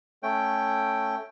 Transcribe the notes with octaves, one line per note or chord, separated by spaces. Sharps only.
A3 C#4 G5